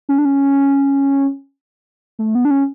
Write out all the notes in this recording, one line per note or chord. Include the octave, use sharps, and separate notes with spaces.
C#4
D4
C#4
A3
B3
D4
C#4